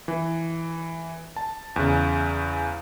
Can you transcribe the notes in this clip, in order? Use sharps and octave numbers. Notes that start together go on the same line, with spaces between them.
E3
A5
E2 C#3